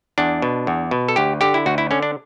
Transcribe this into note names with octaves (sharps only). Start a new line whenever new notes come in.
E2 D4
B2
E2
B2
A4
D2 G4
D3 G4
E4
D2 F#4
E4
D3 C#4
D4